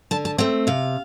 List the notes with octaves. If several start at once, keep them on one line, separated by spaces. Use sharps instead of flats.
D3 A5
A5
A3 C4 G5
C3 F5